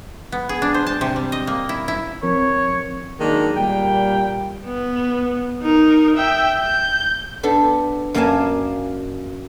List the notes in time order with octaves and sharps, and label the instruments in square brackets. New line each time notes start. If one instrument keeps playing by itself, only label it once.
[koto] B3
G#4
D4
C5
A5
C3
G3
D#5
A#3
E4
E4
[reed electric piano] F3 C4 A#4 [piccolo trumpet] C#5
[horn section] D#3 F#3 G#3 A#3 D4
A#2 G3 G5
[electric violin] B3
D#4 A#4
E5 G5
G6
[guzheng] B3 D4 A4
F#2 A#3 D5 F5 G#5 A5